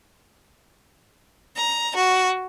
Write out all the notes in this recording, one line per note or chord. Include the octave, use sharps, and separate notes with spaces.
A#5
F#4